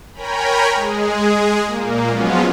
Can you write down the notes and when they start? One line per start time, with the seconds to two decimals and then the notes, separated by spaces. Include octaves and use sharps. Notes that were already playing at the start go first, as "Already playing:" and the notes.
0.14 A#4 C#5 G5 G#5 A#5 B5
0.74 G#3 G#4
1.66 A#2 A#3
2.09 F3 F#3 G#3 B3 C#4 F4